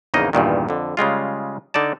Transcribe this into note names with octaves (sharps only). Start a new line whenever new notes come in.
A#1 E2 C#3 A#3 D#4 D#5
E2 G2 A#2 D#3
F2 D3
C#3 G3 G#3 F4
D3 D#4 D5 A5